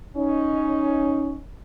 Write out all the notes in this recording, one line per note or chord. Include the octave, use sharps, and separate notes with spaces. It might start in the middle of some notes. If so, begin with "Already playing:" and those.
C#4 D#4